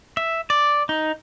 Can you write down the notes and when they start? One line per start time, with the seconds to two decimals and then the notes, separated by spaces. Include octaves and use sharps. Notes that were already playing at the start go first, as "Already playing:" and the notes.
0.17 E5
0.50 D5
0.89 D#4